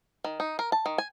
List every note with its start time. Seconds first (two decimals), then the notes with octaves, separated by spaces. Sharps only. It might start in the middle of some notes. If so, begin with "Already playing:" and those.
0.24 D#3
0.40 D#4
0.59 A#4
0.72 A5
0.86 D#3
0.98 G#5